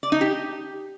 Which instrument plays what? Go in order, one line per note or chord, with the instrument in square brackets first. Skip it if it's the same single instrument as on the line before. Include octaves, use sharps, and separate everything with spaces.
[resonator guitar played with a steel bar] D5
D#4
G4